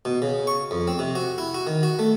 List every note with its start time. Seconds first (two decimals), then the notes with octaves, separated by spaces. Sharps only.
0.05 B2
0.22 C#3
0.47 C#6
0.71 F2
0.87 C4
0.99 C3
1.15 F#4
1.38 E4
1.54 F#4
1.67 D#3
1.83 F#4
1.99 A3